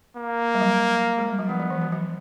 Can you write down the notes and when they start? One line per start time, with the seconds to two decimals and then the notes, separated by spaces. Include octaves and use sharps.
0.17 A#3
0.55 G3
0.61 F#3
1.18 G#3
1.29 G3
1.39 F#3
1.49 F3 B3
1.60 F3
1.70 E3
1.82 F3
1.92 F#3